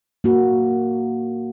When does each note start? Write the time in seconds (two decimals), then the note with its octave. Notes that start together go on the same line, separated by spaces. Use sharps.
0.24 A#3 F#4